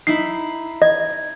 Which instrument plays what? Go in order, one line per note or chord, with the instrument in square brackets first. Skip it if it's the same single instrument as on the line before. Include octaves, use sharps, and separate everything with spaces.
[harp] D#4 E4 [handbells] C7
[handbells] D#5 [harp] G#6